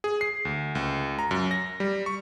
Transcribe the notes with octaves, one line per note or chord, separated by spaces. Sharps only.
G#4
C7
D2
C#2
A#5
F#2
A#6
G3
C#6